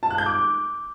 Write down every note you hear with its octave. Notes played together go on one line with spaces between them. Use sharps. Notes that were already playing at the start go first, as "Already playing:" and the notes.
A5
F#6
G6
D6